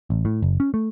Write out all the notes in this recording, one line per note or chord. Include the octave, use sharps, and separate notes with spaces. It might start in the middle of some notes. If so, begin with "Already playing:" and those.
A1
A2
F#1
C#4
A3